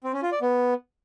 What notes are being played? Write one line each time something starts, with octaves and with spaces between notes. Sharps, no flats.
C4
C#4
F4
D5
B3